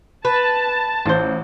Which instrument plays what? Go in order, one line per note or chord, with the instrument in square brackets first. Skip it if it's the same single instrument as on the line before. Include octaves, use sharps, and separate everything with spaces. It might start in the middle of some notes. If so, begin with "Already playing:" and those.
[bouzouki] B4 [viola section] A5
[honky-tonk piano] A1 [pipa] F4 C5